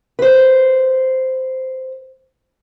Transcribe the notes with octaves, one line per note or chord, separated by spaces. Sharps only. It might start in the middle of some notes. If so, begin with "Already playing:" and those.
B4 C5